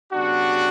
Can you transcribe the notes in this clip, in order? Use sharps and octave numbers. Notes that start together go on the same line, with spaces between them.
C#3 G3 B3 D4 F#4